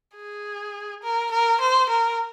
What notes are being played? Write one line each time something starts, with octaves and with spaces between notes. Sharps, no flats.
G#4
A#4
A#4
C5
A#4